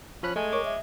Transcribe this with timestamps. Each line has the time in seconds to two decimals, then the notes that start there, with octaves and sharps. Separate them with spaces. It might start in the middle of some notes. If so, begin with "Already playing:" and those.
0.23 F3 C#4 B5 F#6
0.36 G#3 A3 G#5
0.53 A#4 C#5 D6
0.65 E5